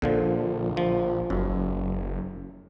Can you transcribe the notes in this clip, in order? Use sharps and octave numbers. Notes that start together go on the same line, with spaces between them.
A#1 A#2 D3 F3
F3
F#1 F#2